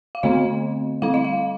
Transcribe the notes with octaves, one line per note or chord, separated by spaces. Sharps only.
F5
D3 A3 C4 D#5
G3 C4 F5
D#5
F5